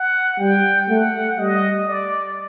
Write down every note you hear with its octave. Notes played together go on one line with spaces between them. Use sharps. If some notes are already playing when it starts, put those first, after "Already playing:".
Already playing: F#5
G3 G5
A3 F#5
G3 D#5
D5